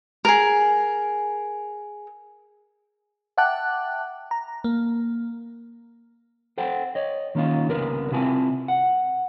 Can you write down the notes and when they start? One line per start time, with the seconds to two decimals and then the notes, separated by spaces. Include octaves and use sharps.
0.25 G#4 A#4
3.37 E5 F#5 G5 A5 D6 F#6
4.31 A#5
4.64 A#3
6.58 A4 C5 F#5 G5
6.95 C#5 D#5
7.35 D#3 A#3 C#4 D#4 F4
7.68 C2 C#3 B3 A#4 B4
8.11 C3 C4 E4 F4 G#5 A5
8.68 F#5